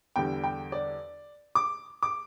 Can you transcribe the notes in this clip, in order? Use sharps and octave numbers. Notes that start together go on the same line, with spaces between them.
E2 D3 G3 G5
G5
D5
D6
D6